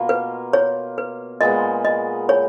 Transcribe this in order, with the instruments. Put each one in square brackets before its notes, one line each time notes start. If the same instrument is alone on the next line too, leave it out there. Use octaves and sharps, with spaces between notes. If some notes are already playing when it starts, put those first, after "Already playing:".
Already playing: [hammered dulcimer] B2 A#3 F4
[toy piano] B4
C#5
B4
[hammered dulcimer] A#2 G#3 B3 [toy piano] D#5
[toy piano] D#5
C#5